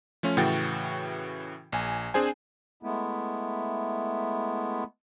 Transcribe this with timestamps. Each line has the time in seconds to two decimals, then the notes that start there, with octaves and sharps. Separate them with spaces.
0.23 F3 A3 C#4 F4
0.37 A2 C#3 E3 F#4 G5 A6
1.72 A#1 G#5
2.14 C4 D4 G#4 C5 G#5
2.83 G#3 A3 B3 E4